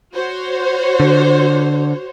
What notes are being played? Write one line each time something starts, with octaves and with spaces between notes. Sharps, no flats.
F#4 C5 C#5
D3